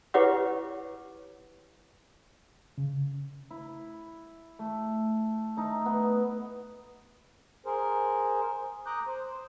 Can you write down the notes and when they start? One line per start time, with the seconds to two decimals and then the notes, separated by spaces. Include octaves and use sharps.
0.14 E4 G4 B4 C#5 F#5 D6
2.78 C#3
3.50 E4
4.59 A3
5.57 A3 D#4
5.86 B3
7.66 G#4 A#4 C5
8.86 A#5 D6 D#6 F#6 G6
9.07 C5